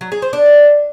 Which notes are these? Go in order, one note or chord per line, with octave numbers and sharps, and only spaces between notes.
F#3
G#4
C5
D4